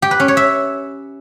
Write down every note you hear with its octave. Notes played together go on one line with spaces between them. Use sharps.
G4
B4
C#4
C#5
E5